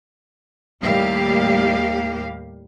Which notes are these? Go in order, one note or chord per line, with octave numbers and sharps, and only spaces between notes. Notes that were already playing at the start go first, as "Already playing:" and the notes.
D#2 A2 G3 A#3 G4 F5